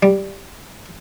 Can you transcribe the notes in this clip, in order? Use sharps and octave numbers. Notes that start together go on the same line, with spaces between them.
G3